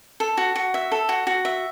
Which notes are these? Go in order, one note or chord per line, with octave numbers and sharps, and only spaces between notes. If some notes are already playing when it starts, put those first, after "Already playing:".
A4
F#4
F#4
E5
A4
F#4
F#4
E5